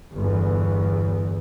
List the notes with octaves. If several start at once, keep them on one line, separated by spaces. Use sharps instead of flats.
G1 E2